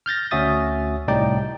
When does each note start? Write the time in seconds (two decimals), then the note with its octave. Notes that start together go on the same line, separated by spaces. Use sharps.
0.06 F6 G6 A6 A#6
0.31 D2 C#4 F#4 E5 D#6 A6
1.08 C2 A2 G3 D#4 D5 G5